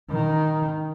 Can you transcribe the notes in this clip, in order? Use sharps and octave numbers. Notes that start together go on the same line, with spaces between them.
D#3